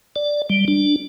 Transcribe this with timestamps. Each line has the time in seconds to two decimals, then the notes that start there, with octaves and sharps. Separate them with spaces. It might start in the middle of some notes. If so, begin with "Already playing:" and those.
0.16 D5
0.50 G3
0.68 D4